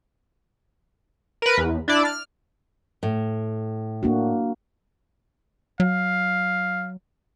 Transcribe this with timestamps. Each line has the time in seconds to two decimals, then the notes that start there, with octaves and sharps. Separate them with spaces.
1.42 A#4 B4
1.58 E2
1.88 D4 E4 D5
2.05 F6
3.03 A2
4.03 A#3 D4 F#4
5.80 F#3 F5